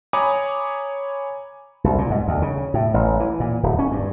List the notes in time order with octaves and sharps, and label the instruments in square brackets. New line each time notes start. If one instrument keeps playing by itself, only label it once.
[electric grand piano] C#5 G#5 A#5 B5 D6 D#6
[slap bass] C2
A#2
G#2
D2
C#3
A2
A1
E3
A#2
D1
C#4
G2